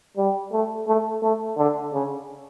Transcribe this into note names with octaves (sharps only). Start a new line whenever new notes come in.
G3
A3
A3
A3
D3
C#3